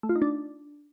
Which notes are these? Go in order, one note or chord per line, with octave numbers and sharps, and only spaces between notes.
A3
F4
D#4
D4